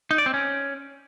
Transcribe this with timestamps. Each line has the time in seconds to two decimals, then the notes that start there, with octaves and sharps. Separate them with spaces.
0.11 D#4
0.18 D5
0.26 C4
0.34 C#4